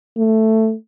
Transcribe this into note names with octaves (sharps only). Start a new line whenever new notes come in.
A3